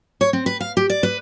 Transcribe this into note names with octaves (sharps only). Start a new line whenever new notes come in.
C#5
C4
B4
F5
G4
D5
B4